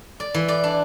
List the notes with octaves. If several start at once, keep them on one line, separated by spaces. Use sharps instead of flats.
D5
E3
D5
D4